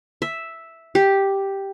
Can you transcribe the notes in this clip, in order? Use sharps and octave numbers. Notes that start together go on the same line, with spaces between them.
E5
G4